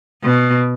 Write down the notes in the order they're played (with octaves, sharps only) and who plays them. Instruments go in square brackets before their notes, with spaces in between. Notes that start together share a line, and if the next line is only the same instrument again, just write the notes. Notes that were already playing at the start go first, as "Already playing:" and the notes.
[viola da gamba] B2